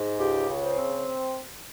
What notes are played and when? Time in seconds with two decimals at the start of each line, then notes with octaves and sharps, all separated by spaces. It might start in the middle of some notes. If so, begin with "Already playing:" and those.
Already playing: G#2
0.19 C#2 G4
0.49 C#3
0.63 C5
0.78 C4